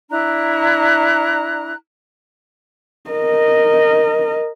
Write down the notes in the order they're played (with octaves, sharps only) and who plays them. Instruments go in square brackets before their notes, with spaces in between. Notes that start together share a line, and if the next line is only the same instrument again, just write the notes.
[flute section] D4 E4 A#5 F#6
[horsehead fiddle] A#4 D#5